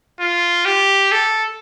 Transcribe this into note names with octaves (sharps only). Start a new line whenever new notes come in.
F4
G4
A4